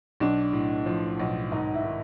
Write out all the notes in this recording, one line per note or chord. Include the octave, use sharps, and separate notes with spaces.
B1 D4
A2
F3
B1
G#1 D#4
E4
D#3